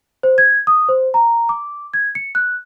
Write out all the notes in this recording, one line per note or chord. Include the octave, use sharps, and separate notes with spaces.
C5
G#6
D#6
C5
A#5
D6
G#6
C#7
F#6